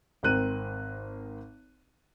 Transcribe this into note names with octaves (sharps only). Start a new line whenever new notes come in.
G#1 C4 A#4 F#6 D#7